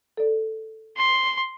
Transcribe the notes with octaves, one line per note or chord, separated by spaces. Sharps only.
A4 D5
C6